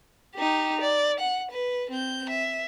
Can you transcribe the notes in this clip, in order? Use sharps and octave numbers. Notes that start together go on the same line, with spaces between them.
D#4 G4
D5
F#5
B4
C4 G6
E5